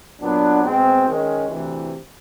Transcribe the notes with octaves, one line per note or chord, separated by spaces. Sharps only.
A#2 F#3 B3 D4
B2 G#3 C4
D#3 G#3 C#4
D2 C3 E3